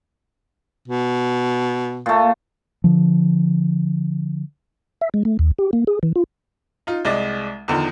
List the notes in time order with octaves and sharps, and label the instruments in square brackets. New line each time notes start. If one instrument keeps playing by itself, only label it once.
[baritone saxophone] B2
[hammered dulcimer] A#2 A3
[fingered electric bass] D3 F3
[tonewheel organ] E5
G#3
A3
D#2
G4
A#3
G#4
E3
F4
[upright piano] D#4 F4
C2 G#3 D5
E2 D3 D#3 F3